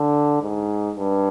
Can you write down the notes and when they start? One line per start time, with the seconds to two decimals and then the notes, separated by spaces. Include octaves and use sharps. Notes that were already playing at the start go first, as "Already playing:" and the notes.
Already playing: D3
0.42 G#2
0.95 G2